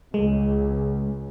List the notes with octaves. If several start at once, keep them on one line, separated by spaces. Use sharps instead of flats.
C#2 G#3